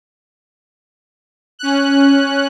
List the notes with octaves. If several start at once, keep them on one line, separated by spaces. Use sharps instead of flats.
C#4 F#6